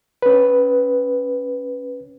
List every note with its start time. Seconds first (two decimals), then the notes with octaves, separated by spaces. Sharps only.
0.22 C#4 B4